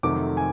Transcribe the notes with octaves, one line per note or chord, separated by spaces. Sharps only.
F2 C3 D#3 F#3 A3 D6
G#5